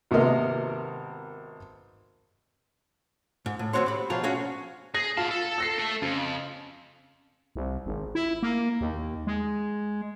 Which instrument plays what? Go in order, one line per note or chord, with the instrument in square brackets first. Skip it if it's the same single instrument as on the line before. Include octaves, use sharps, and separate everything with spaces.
[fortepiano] G#1 C3 A#3 B3 A#4 D#5
[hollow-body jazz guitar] G#2
A2
D#2 F3 C4 F#4 C#5 C6
G4 B5
B2 F3 F4 G#4 C#5 A#5
C#4 D4 F#4 G#4 C#5 F5
[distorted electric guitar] G#4 [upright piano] A#6 C7
[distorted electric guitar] B3 A5 [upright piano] F4
[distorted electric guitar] A4
[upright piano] E6 A#6 C7
[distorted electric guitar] A3 A4
[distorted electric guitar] F2 [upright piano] C#3
[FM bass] C2
G#1
E4
A#3
D#2
G#3